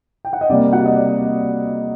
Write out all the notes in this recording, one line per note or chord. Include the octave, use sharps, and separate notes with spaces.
G5
F#5
D#5
C3 G3 A#3 D5
F#4 F#5
D#5
D5